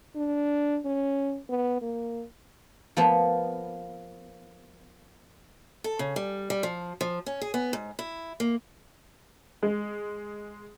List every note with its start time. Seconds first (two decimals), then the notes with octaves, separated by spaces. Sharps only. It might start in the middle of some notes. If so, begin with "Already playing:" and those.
0.16 D4
0.85 C#4
1.50 B3
1.82 A#3
2.97 F3 A#3 B3
5.84 A4
5.99 C#3
6.16 G3
6.50 G3
6.63 F3
7.01 F3
7.26 C#4
7.41 G#4
7.54 B3
7.73 G#2
7.99 E4
8.40 A#3
9.63 G#3